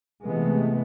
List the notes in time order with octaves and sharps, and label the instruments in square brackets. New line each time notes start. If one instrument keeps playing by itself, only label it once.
[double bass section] C3 E3 G#3 A3 B3